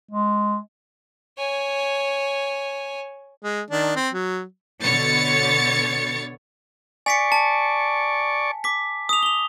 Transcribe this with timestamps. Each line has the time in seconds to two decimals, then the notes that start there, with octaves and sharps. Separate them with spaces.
0.11 G#3
1.38 C#5 G#5
3.43 G#3
3.71 D#3 D4
3.96 C4
4.13 F#3
4.82 B2 D3 C#5 A6 C#7
7.06 D5 G#5 C#6 B6 C#7
7.32 A5
8.64 D6 B6
9.09 D#6 F7
9.23 F7 G7